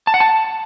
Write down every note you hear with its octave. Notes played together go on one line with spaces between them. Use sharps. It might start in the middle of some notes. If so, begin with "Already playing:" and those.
A5
F#5
A5